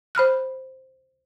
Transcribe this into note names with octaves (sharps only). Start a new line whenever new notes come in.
C5 B5 F6 F#6